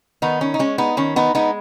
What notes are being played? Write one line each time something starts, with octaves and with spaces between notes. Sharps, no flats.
D#3 B3 D#4
C#4
D#4
G#3 C#4
B3 D#4
D#3 C#4
B3 D#4
G#3 B3 D#4